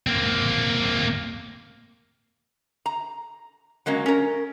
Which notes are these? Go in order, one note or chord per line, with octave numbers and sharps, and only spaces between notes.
A#3 C4
A#5
F#3 G#3 A#3 C#4
C#4 A#4